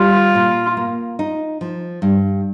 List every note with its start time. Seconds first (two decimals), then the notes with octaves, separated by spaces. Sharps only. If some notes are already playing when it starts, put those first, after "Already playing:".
Already playing: G3 F4
0.35 A#2
0.77 A#3
1.19 D#4
1.61 F3
2.02 G2